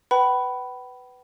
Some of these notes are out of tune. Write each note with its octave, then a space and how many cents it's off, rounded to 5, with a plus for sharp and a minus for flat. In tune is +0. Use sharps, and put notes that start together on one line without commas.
B4 +10 G5 -45 B5 +0